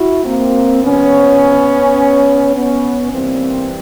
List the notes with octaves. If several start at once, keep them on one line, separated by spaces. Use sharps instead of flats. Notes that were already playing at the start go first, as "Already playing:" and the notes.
Already playing: E4 F#4
A#3 C4
F2 C3 F3 B3 C#4
B3 C#4
G2 E3 G3 A#3 C4